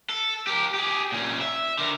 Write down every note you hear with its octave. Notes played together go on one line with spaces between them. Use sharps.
A4
G4 A#4
G4 G#4
A#2 C#4
E5
D3 A#4